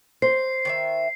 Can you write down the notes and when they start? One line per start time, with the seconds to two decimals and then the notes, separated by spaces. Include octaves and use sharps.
0.22 C5 C7
0.65 D#3 C#5 E5